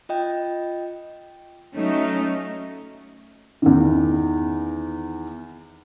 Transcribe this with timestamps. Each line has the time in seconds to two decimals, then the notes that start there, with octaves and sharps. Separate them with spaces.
0.09 F4 D#5 G5
1.74 F#3 A3 C#4 D#4
3.62 E2 D#3